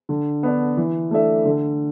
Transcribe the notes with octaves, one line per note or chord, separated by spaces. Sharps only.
D3
B3 D4
E3
A3 D4 A4 E5
D3